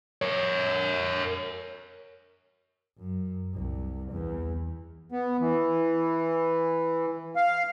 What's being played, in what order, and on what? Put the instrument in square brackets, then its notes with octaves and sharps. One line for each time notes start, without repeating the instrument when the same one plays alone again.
[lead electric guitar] A#4 C#5
[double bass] F#2
C2
E2
[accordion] B3
E3
F5